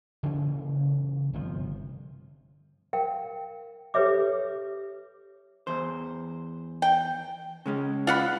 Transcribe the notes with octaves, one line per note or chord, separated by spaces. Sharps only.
C#3 E3 F#3 A#3
G1 C3 F3
A#4 F5 G5
G4 A4 B4 C#5 E5 D6
E2 C5
G5
C#3 G#3 C#4
F4 F#5 B5